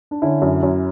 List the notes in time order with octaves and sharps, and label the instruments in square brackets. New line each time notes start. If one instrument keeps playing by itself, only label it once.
[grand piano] D4
D3 C#4 E4
F#2
F#2